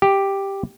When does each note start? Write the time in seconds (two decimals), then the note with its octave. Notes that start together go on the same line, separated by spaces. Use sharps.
0.02 G4